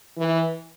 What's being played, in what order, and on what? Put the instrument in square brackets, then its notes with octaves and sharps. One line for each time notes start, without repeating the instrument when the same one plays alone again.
[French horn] E3